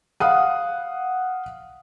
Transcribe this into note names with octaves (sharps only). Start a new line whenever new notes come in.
F5 F#5 D#6